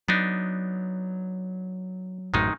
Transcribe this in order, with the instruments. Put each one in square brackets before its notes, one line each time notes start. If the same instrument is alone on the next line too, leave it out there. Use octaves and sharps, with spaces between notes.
[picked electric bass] F#3 [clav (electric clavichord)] B3 D4 D#4
[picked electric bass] A1 F#2 A2 [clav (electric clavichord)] D#3 G#3 D#4